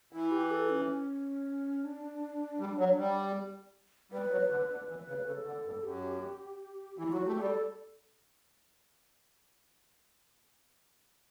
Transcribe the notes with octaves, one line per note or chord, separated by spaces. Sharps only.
E3 E4
G4
A4
C#4
D4
G3
F#3
G3
G3 B4
F#3
D3
D3 B4
E3
B4
C#3
C#3 A4
D3
G2
F#2 G4
E3 E4
F#3 F#4
A3 G4
G3 A4